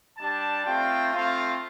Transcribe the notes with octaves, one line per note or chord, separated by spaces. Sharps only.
G3 D4 G4 A5
A3 C4 F4 G5
A3 C4 F4 F5